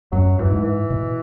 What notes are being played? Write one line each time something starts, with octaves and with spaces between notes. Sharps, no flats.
F#2 F#3
F#2 E3
G#2
E3
B2